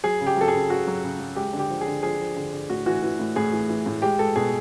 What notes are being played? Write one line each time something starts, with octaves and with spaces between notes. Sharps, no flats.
F#3 G#4
C#3
G4
F#3 A4
G#4
C#3
C#3 F#4
F#3
C#3
F#3
G#3 G4
D3
G4
F3
G#4
D3
F3 G#4
F3
D3
D3
A2 F#4
E3 F#4
E3
A2
A2 G#4
E3
E3
A2
G#3 G4
G#3 A4
B2 G#4